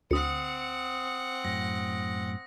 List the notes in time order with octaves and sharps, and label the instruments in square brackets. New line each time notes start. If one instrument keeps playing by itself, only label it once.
[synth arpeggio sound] D2 [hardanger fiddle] C4 F#5 [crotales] D#6 C#7
[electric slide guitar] F#2 A2 [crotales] A#6